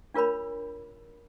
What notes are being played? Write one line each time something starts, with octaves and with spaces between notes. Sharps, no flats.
D4 F4 A#4 C#5 B5